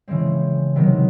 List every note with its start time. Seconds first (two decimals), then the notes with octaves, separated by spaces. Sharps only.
0.08 C#3 E3 G#3 C4
0.76 C3 D#3 F#3 B3